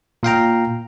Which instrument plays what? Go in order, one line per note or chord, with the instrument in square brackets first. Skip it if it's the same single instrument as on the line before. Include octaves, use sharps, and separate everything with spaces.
[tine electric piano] A#2 F5 G5 A#5